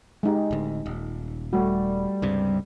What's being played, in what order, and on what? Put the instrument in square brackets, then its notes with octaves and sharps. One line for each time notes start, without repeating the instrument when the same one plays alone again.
[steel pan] G#3 D#4 G4
[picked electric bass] D1 D2
D#1
[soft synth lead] G3 [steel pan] A3 F#4
[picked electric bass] C#2 G2 C3